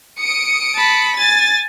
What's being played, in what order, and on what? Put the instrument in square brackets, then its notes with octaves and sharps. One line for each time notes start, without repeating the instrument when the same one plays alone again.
[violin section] D#6 C#7 D7
[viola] A5 B5
[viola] G#5 [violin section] A6